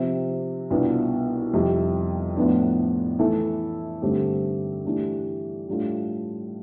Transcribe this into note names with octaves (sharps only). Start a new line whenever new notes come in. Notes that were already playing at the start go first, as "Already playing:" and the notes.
Already playing: C3 F3 C4 G4
C2 B2 B3 D4 F4
F2 C3 G3
A2 F3 B3 D4
E3 A3 E4 A4
G2 D3 A3 C4 G4
E3 A3 D4 G4
A2 G3 D4 F4 A4